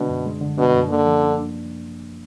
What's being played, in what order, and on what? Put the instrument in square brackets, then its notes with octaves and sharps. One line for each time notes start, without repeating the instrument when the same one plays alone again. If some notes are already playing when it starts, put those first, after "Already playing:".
Already playing: [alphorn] B2 [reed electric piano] D3 G#3 D4
[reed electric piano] F#2
G#3
D3
[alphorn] B2 [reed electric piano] D4
[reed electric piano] F#2
[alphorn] D3 [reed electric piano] A#3
[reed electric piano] F3
D4